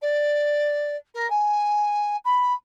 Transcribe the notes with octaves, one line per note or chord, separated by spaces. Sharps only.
D5
A#4
G#5
B5